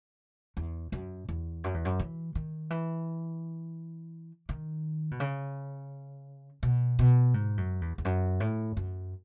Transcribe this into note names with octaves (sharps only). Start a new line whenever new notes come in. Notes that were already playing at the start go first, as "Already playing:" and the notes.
E2
F#2
E2
F#2
E2
F#2
E3
D#3
E3
D#3
B2
C#3
B2
B2
G#2
F#2
E2
E2
F#2
A2
F#2